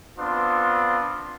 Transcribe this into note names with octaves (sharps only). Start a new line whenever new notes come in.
B3 C4 D4 F4